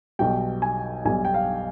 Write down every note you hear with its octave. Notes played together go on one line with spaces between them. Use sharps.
B1 B2 G3 G5
G#5
B1 B2 G3 G#5
G5
F5